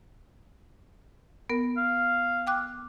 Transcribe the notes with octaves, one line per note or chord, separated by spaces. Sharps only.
B3 A#4
F5
G5 D6 F#6